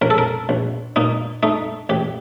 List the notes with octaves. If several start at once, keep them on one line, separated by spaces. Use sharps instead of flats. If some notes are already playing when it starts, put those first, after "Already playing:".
A#1 A#4
A4
A#4
A#1
A#2 D#4
A3 D#4
A1 G4